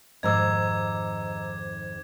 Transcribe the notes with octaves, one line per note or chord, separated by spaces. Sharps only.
F2 G#2 D#3 D#5 A#5 D6 E6 G#6